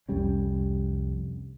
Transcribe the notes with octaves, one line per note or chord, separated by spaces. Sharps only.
C2 F2 G3 C#4